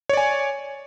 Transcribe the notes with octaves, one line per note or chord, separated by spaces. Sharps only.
C#5 D5 G#5